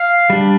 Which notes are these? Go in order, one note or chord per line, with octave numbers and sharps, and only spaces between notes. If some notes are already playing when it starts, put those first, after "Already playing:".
Already playing: F5
G3 D4